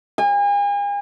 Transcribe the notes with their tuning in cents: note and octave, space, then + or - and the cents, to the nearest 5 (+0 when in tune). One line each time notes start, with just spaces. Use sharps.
G#5 -40